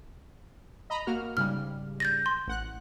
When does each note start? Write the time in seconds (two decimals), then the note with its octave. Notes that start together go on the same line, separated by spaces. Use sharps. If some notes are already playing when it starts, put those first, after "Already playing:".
0.90 D#5 A#5 B5
1.07 A#3 F#4 F6
1.37 G#2 C#3 G3 F6
2.00 G6 A6 A#6
2.26 C6
2.47 A1 F#5 F#6